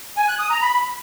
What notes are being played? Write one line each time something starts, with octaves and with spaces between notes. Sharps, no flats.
G#5
F#6
D#6
A#5
B5